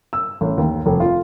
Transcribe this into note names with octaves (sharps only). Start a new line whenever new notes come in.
E6
A1
D#2
F1
F4